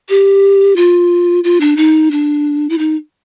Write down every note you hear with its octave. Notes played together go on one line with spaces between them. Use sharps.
G4
F4
F4
D4
D#4
D4
E4
D#4